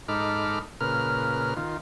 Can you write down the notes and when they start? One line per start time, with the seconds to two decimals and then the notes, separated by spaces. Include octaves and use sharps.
0.08 G#2 D#4 A4 B5 D6 F6
0.80 A#2 C#3 A#4 B4 F6
1.57 D#3 F4